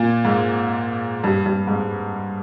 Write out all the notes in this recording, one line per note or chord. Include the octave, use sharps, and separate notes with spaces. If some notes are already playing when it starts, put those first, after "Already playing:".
Already playing: A#2
G#2
G2
G2
G#2